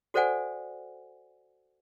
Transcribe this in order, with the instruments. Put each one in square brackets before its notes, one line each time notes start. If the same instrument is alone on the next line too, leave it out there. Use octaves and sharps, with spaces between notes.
[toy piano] F#4 A4 C5 D5 F#5 G#5